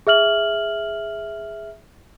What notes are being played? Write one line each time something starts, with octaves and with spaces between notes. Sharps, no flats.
G#4 E5 F6 F#7